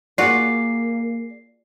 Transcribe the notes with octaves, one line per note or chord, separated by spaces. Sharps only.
A#3 F4 F#4 G#4 D5 C7